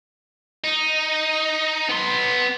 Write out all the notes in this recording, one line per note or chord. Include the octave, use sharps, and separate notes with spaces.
D#4
B3 C6